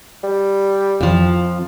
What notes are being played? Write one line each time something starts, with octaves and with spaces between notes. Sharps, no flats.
G3
F2 F3